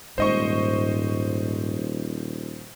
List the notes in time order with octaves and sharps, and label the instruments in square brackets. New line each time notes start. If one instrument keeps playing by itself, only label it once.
[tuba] D#1 [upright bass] G#2 [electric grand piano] C5 D#5 C#6